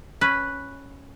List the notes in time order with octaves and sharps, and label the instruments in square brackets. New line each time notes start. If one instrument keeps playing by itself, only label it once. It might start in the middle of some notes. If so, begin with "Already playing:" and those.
[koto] C#4 B4